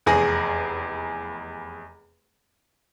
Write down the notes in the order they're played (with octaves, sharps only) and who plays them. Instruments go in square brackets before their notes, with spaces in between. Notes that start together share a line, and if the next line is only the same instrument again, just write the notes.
[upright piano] F1 E2 G#4 G#5 A#6